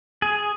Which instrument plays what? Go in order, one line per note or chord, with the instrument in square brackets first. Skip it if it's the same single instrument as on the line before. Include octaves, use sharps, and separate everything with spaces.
[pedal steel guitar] G#4